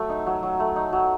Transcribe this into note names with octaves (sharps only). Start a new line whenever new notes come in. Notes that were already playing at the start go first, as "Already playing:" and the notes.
Already playing: F#3 A3 E5
D#4
F#3
F#3
A3
D#4
F#3